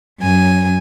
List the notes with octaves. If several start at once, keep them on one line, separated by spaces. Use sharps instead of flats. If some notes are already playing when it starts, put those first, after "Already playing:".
F#2 G#5